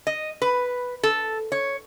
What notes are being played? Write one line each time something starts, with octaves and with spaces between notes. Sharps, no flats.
D#5
B4
A4
C#5